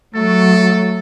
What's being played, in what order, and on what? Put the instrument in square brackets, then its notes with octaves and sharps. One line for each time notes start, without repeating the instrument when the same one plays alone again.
[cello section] F#3 [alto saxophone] A3 [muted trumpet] A4